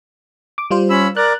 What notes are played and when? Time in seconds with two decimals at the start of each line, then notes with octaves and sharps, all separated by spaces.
0.58 D6
0.71 G3 F4 C5
0.90 C#4 B5 E6
1.17 A#4 D5 F#6